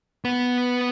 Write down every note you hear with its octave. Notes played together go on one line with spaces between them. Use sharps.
B3 B4